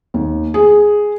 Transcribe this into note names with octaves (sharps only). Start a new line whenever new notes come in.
D#2
G#4